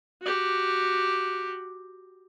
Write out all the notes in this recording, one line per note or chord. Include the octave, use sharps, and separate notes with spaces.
F#4 G4